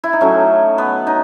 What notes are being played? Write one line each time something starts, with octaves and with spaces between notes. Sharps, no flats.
E4
D#4
A2 F#3 A3 C#4
B3
D#4